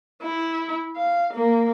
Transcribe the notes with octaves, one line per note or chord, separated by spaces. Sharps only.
E4
F5
A#3